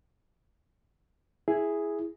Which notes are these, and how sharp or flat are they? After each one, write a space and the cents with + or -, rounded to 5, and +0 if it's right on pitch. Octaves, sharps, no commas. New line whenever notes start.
E4 +0 G#4 +0